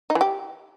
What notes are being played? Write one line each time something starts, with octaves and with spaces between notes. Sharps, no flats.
D#4
E3
G4